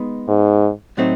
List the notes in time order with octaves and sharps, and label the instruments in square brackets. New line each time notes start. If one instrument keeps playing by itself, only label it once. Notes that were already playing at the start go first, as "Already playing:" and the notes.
Already playing: [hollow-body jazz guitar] G#3 B3 D#4
[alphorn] G#2
[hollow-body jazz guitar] A2 F#3 A3 C4 D#4